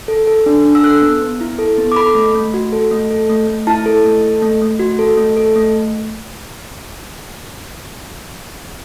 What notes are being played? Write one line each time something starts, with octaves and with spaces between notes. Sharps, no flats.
A4
A4
D4
D4
E6
A4 F#6
B3
B3
E4
A4
B3
D6
A4 B5
A3
A3
F#4
A4
A3
A4
A3
A3
E4 A5
A4
A3
A4
A3
A3
F#4
A4
A3
A4
A3